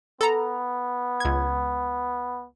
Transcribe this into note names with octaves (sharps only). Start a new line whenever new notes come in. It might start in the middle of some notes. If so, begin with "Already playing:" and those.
B3 A4 A#5
C#2 G#6